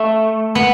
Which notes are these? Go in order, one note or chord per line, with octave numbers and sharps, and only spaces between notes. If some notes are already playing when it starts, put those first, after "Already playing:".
Already playing: A3
B3